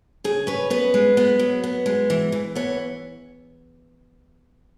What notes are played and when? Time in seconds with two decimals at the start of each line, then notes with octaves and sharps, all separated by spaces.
0.24 C#3 G#4
0.47 C#4 B4
0.70 B3 B4
0.94 G#3
1.17 B3
1.39 F#3
1.64 B3
1.86 G#3
2.10 E3
2.32 E3
2.55 B3 C#5